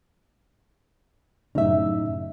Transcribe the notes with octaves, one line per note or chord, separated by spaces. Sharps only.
F#2 A2 C#3 D#4 E5